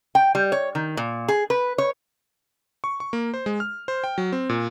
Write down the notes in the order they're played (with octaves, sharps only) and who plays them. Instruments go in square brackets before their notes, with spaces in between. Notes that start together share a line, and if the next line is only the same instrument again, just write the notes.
[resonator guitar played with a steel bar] G5
G3
C#5
D#3
A#2
G#4
B4
C#5
[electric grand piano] C#6
C#6
A#3
C5
G#3
F6
C5
G5
F#3
C4
A#2